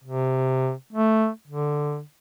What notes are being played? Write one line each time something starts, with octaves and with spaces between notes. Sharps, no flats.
C3
A3
D3